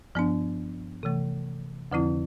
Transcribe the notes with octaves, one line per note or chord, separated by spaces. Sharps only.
G2 F3 B3 D4
C3 E3 A3
F2 D3 F3 C4 E4